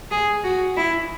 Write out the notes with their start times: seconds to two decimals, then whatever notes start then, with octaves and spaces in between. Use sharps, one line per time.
0.11 G#4
0.44 F#4
0.77 E4